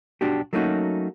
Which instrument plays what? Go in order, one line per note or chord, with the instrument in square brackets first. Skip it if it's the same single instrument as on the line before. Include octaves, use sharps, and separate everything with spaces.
[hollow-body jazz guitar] B1 D4 F#4 G4
F#3 A3 A#3 C#4 D#4 F#4